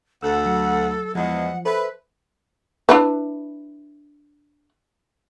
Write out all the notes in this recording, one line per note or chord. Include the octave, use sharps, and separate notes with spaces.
D2 A4 F#5 E6 F#6
F#3
E2 F3 G#3 F#5
A4 B4 C5 E5
D4 E4 B4